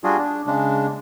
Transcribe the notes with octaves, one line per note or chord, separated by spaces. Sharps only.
G3 D4 F4 F#4 G#4
D4
C#3 G#3 D4